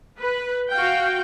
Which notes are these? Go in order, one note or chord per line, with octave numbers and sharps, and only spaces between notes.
B4
F#4 F5 G5